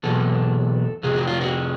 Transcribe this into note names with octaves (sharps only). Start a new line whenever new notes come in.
E2 B2 F#3 A4
F2 C3 G#4
F#4
F4
F#4